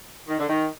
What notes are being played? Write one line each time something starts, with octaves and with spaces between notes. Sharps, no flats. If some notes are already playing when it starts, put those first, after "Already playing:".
D#3
D3
D#3